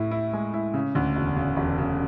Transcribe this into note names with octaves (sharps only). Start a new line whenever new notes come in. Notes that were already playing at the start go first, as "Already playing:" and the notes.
Already playing: A2 E4
E4
G#3
E4
C#3
D2
E1
C#3
E1
C#3